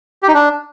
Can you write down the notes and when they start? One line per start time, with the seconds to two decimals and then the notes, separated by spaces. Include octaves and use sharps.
0.23 G4
0.28 D#4
0.34 D4